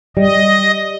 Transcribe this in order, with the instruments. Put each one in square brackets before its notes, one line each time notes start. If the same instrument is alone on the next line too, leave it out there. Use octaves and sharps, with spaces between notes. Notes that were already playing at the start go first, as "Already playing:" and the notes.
[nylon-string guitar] G3 [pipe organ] D#5